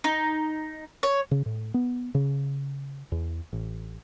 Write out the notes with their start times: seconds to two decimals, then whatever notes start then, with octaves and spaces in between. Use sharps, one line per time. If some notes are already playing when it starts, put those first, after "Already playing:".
0.04 D#4
1.03 C#5
1.31 C#3
1.46 A2
1.74 B3
2.15 C#3
3.12 E2
3.53 A1